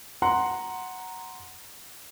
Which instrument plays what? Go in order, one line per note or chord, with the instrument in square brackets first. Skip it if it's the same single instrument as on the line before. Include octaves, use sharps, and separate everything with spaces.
[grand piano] F#5 A#5 C6